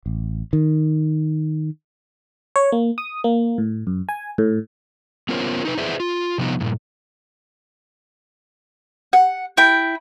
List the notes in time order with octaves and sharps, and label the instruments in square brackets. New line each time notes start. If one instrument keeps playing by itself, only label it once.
[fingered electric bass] A1
D#3
[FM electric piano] C#5
A#3
D#6
A#3
A2
F#2
G#5
A2
[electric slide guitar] B3 C#4 F4 A#4 C5 C#5
D#4 B4
E4 G#4 B4 C5 D5 E5
F4
C3 F3 B3 D#4
G2 A#2
[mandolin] F#5
E4 G5